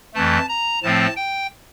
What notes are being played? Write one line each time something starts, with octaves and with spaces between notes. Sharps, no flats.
F2 E3 A3 A5
A#5
A2 F3 A3 C4 A5
G5